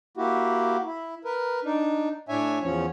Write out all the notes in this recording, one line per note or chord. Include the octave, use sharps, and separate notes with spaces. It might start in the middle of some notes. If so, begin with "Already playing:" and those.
A#3 E4 F#4 G4
E4
A#4 B4
D4 D#4
A2 D4 C#5 E5 G#5
E2 F3 C#4 C#5